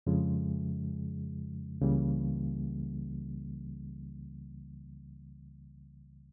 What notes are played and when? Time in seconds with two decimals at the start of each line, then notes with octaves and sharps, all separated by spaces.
0.07 F2 C#3 F3 G#3
1.81 C#2 C#3 E3 G3 A#3